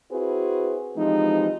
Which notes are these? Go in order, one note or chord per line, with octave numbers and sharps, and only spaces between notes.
C4 E4 F#4 G#4 B4 C5
E3 F3 G#3 C4 D#4 G4